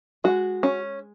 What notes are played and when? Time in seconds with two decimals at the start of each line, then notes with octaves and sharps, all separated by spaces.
0.24 G#3 F#4
0.63 C#4